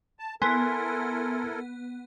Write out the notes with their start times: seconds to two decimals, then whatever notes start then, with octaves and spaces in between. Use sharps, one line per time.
0.19 A5
0.42 B3 E4 A4 A#4 G#5 C6